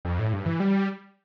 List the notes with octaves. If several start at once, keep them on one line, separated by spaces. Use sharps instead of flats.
F2
A2
G2
E3
G3